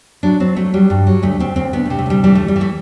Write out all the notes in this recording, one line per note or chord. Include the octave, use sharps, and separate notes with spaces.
F#3 D4
F#3 C4
F#3 A3
F#3 G3
G2
F#3
D2 A3
D2 C4
D2 C4
D2 B3
A3
C3
A3
D2 G3
E3 G3
E3 A3
G3
E3
A3